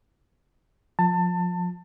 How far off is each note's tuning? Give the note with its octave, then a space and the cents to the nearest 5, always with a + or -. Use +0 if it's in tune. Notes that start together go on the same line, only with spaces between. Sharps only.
F3 +30 A5 +25